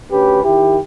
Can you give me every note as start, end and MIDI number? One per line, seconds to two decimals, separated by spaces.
0.11 0.43 38
0.11 0.43 61
0.11 0.43 67
0.11 0.43 71
0.44 0.77 51
0.44 0.77 64
0.44 0.77 67